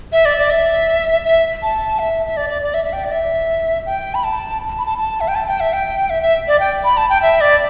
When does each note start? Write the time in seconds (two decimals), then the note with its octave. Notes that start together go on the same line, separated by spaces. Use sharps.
0.12 E5
0.25 D5
0.38 D5
0.50 E5
1.25 E5
1.62 A5
1.99 E5
2.27 E5
2.37 D5
2.50 D5
2.62 D5
2.74 E5
2.85 E5
2.93 G5
3.04 D5
3.12 E5
3.86 G5
4.15 B5
4.24 A5
4.79 B5
4.86 A5
4.98 A5
5.21 E5
5.28 G5
5.35 A5
5.48 G5
5.60 E5
5.73 G5
6.10 E5
6.23 E5
6.48 D5
6.60 G5
6.84 B5
6.97 A5
7.09 G5
7.22 E5
7.41 D5